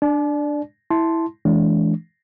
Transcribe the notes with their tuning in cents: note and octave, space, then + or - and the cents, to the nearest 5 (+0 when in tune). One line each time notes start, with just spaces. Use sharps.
D4 +5 D5 +5 A5 -45
E4 -5 A5 +0 C6 +0
E3 +0 G#3 +35 D4 -35